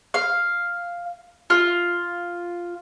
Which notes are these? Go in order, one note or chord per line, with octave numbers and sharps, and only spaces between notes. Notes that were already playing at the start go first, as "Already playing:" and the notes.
F5
F4